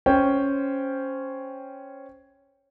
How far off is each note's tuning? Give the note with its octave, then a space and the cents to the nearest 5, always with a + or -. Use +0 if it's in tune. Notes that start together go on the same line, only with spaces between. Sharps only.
C#4 +0 C5 +0 G5 +0